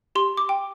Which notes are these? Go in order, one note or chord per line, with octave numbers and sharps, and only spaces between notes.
G4 C6
D6
G5